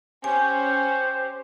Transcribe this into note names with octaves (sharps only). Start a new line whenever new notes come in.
C#4 G4 C5 G#5